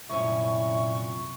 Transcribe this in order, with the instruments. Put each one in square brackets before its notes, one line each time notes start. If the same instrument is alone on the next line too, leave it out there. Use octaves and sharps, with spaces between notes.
[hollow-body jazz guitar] C2 F#2 C#4 [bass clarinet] A#2 [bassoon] E4 [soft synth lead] C#6